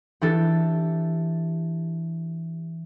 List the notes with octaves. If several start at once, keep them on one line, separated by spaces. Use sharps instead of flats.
E3 D4 G4 A4